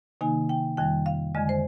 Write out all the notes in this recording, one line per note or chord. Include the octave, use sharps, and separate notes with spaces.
C3 D#3 A#3 D#4 G#5
G5
F2 D#3 G3 G5
F5
F2 D3 G#3 D#5
C5